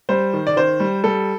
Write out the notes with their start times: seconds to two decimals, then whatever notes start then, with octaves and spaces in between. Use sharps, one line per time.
0.09 G3 C5
0.33 D#3
0.47 D5
0.56 D#3 C5
0.80 G3
1.03 G3 A4